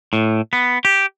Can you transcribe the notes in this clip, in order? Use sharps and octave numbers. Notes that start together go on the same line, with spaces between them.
A2
B3
G4